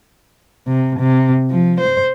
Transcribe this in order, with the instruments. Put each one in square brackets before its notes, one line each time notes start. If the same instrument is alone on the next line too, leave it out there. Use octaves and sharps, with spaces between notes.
[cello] C3
C3
F3
C5